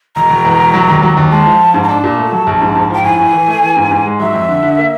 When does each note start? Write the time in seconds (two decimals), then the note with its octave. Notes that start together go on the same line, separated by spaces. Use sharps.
0.16 E1 A#5
0.30 E1
0.45 E2
0.59 E1
0.74 F#3
0.88 D#2
1.02 F#3
1.17 D#2
1.31 G#3 A5
1.46 F3
1.60 F3
1.74 G#2
1.83 A#5
1.89 D4 A5
2.04 A#2
2.18 A3
2.32 F#3
2.47 A#1
2.61 G#2
2.75 G#2
2.90 F3 G5
3.04 A2 G#5
3.19 A2
3.33 E3
3.48 A3
3.61 E3
3.77 G#2
3.91 G#2
4.05 G#3
4.20 F#3 E5
4.34 F2
4.48 D3
4.63 D3
4.78 A#3